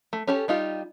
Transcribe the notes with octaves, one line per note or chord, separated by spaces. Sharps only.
A3
C#4 G4 A4
G3 D#4 F4 G4